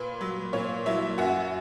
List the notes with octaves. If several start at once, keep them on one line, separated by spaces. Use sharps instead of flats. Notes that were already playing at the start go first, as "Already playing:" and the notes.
Already playing: A#2 B4 B5
F#3
A#2 C#5 C#6
F#3 E4 E5
F#2 F#4 F#5